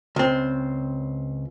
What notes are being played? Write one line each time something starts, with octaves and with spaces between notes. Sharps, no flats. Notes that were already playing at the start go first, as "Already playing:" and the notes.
C#2 C4